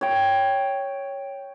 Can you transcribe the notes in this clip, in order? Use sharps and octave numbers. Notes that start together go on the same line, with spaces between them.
C#5 G5